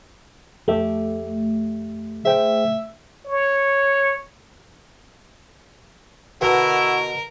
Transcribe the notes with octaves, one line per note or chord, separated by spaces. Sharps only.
F2 A3 G4 E5
G#4 C5 E5 G5
C#5
B2 D3 E4 F#4 A#4